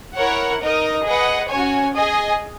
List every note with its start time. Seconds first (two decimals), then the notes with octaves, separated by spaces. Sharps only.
0.15 E4 A#4 C#5 F#5
0.61 D#4 A#4 D#5
1.05 G#4 B4 D#5 F#5
1.50 C#4 F#4 C#5 G#5
1.94 G#4 D#5 G#5